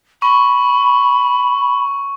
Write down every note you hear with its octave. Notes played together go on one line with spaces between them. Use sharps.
B5 C#6